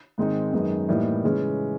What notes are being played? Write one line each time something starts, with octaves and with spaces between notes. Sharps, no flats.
G#2 D#3 G#3 C4 D#4
F#2 D#3 G#3 B3 D#4
A2 E3 G3 A#3 D#4
C#3 E3 G#3 C#4